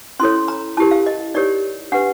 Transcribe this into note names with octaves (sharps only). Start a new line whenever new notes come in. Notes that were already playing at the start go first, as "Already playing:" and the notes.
C#4 E4 A4 C#5 C6
A#5
E4 G4 A#4 A5
F5
D#5
D#4 G4 A#4 C#5 D5
D4 G4 B4 F#5